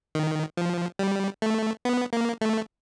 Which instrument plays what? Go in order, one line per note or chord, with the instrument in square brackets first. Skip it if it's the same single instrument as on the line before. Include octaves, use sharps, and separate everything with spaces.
[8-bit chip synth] D#3
F3
G3
A3
B3
A#3
A3